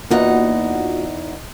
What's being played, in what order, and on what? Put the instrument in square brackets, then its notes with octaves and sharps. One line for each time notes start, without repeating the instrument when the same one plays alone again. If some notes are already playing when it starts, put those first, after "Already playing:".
[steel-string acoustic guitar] E2 D#4 F#5 [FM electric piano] A#3 F4 F#4